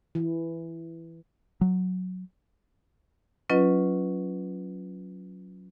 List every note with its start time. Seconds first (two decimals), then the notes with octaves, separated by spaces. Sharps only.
0.15 E3
1.61 F#3
3.50 F#3 C#4 F4 B4 D#5